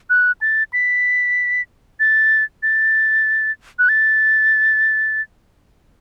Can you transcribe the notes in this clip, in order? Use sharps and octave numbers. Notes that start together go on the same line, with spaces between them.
F#6
A6
B6
A6
A6
F#6
A6